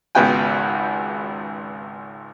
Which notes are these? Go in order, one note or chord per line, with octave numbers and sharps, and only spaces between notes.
G#1 C#2 B3 F#4 G5 G#5